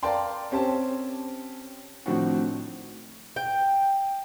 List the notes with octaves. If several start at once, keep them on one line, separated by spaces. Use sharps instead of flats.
A#4 D5 F5 G5 A5 C6
C4 C#4 G4 C5 A5
A2 D#3 F3 C4 D4 F#4
G5